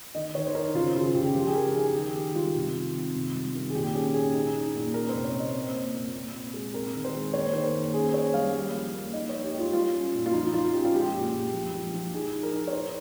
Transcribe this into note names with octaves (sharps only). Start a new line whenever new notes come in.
D#3 D#5
D#3 C#5
C5
D#4 A#4
C#3 F4
C#3 F4
C#3 G4
F3
G4
G#4
F3 A#4
D#4 G#4
D#3 G4
D#3
G3 F4
C3
D#3
C4
C3
G3
D#3
G#4
A#2 G4
C#4 G#4
C#4 G#4
D#4
D#4
A#2
C#4 A#4
C5
C3
C#5
A#3
D#5
C4
A#2
A#2
A#2
C4
G#3
C4 A#4
D#3
C5
G#3
A#3 C#5
D#3 C5
A#4
A#3
C#4 G#4
C#4 C#5
G3 F5
A#3
F3
A#3
D#4 D#5
D#4 C#5
G4
G#3
F4
G3 F4
C#4
A#2
F4
F3 D#4
F3 F4
C#4 G4
F4
G#3 G4
A#2
A#2
F3
F3
F3
D#4 G#4
D#4
A#4
D#4
C#5
D#4 C5